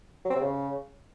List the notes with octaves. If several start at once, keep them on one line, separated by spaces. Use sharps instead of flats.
F#3
C4
C3
C#3